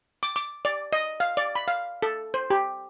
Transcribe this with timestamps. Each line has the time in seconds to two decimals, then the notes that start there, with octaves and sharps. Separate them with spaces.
0.23 D6
0.36 D6
0.65 D5
0.93 D#5
1.20 F5
1.37 D5
1.55 B5
1.68 F5
2.03 A4
2.34 C5
2.50 G4